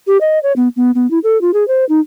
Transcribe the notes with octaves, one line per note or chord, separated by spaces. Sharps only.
G4
D#5
C#5
B3
B3
B3
E4
A4
F4
G#4
C5
D#4